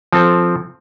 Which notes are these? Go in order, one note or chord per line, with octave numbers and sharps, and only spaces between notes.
F3 C4 A4